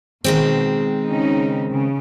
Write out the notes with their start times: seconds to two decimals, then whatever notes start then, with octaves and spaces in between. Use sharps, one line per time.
0.24 B2 D#3 G#3 C4
1.07 C#3 C#4 D#4
1.70 C#3